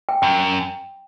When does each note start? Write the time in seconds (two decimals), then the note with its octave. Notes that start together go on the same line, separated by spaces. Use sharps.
0.09 G5
0.22 F#2 G5